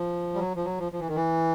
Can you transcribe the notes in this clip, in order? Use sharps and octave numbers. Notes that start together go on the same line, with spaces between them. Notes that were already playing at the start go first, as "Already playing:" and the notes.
Already playing: F3
G3
F#3
F3
F#3
F3
F3
E3
D#3
E3